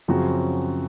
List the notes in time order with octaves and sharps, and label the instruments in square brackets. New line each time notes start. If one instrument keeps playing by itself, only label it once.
[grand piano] F#2 C#3 F3 C4 F#4